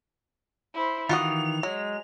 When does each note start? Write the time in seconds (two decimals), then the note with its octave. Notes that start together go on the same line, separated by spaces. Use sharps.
0.74 E4 C5
1.09 D#3 E3 F4 F#4 F#5 D#6 F7
1.63 F#3 G#3